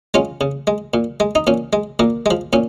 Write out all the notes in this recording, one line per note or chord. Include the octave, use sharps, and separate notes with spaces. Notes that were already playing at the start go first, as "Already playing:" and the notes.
G#3 C#4 F4
C#3
G#3
A#2
G#3
D#4
A#2 C#4
G#3
A#2 A#3
F3 G#3
A#2 C#4